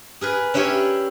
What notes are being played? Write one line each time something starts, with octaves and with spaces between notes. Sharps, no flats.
G#4 A#4 B4
C#4 D4 E4 G4 C#5